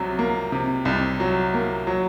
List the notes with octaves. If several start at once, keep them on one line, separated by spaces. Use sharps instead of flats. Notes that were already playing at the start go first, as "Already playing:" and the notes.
Already playing: C2 C3 F#3
A#3
C3
C2
F#3
A#3
F#3